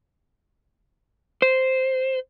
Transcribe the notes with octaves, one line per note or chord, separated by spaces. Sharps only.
C5